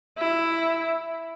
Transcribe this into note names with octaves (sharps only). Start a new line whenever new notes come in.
E4